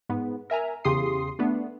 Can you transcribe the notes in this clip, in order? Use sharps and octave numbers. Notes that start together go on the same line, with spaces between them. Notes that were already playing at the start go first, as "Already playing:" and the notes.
G#2 B3
A#4 E5 G#5 A#5
E2 C#3 G4 C6 D#6 C7
A3 B3 D4